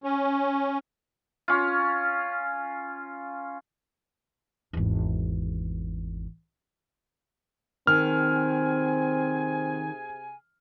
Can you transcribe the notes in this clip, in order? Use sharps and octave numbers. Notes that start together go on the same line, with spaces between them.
C#4
C#4 F4
G#1 E2
C3 D#3 C4 G#4 G#5 F6